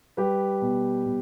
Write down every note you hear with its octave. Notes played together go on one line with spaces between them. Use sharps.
G3 G4 B4
B2
B2